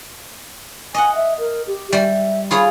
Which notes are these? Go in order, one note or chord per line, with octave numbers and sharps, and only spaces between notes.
D#5 F#5 G#5
E5
A#4
G4
G3 E5
F4 G#4 C#5 B5